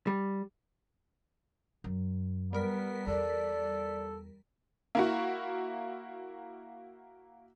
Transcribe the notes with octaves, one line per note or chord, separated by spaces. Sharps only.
G3
F#2
G3 B3 A#4 B6
E2 A4 D5
A#3 E4 F#4